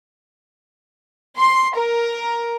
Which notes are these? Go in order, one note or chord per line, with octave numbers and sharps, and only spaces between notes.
C6
A#4